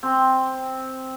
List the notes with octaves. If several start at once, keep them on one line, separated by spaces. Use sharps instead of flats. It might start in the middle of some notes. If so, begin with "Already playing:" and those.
C4